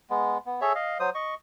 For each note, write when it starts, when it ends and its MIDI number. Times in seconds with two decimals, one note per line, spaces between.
0.10 0.38 56
0.10 0.38 59
0.46 0.60 59
0.61 0.73 68
0.61 0.73 69
0.61 0.73 73
0.61 0.73 76
0.75 0.98 75
0.75 0.98 77
1.00 1.10 54
1.00 1.10 72
1.00 1.10 87
1.15 1.35 75
1.15 1.35 85